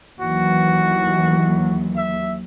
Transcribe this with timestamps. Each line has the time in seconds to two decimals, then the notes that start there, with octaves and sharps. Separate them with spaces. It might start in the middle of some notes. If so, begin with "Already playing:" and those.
0.20 D#2 E3 F#3 F#4
1.96 E5